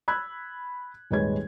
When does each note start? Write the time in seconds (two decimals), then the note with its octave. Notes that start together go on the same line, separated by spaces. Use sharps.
0.08 B5 E6 F#6 G#6
1.11 D#1 G#1 G#3 B4 C#5 G#6